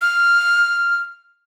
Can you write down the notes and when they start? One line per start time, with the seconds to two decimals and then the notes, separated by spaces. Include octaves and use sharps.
0.02 F6